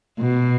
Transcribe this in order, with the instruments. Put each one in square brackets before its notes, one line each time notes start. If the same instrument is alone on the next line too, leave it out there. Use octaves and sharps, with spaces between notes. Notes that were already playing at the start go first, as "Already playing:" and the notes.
[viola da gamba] B2